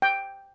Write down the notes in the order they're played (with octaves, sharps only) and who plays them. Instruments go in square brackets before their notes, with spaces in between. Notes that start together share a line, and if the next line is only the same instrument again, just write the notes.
[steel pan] G5